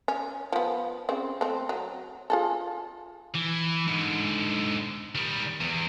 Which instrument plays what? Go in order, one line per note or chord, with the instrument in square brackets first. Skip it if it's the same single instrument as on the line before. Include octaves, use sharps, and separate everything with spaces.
[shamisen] C#4
F3 B3
C#3 C4
A3 C4
F#3
F4 G#4 A4
[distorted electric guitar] E3
G#2 D3
D#3 G3
E2